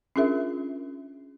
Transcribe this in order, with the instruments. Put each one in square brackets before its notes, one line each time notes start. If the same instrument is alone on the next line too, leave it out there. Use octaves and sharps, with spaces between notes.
[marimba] C#4 D4 F4 G#4 A#4 E5